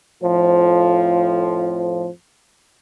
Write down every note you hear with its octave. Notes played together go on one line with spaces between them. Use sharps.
F2 A2 F3